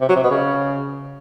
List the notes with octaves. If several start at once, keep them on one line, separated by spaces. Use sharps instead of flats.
C3
F#3
C3
B2
C#3